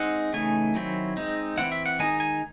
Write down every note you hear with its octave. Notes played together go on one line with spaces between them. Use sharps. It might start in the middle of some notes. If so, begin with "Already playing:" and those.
Already playing: G#3 C4 D#4 F#5
C#3 E3 A3 D#4 G#5
D#3 F#3 C4 E4
G#3 C4 D#4
E3 C4 E4 F#5
E5
F#5
D#3 G#3 D#4 G#5
G#5